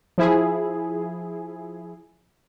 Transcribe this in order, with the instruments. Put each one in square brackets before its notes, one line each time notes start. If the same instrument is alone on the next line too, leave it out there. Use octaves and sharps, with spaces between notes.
[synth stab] F3 E4 G#4